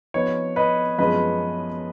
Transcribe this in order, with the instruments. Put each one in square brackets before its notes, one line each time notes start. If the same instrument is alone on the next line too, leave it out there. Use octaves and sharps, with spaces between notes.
[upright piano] F3 B3 D#4 [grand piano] C#5
[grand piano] B4 D#5
[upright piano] F#2 F3 G#3 B3 [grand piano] B4 D#5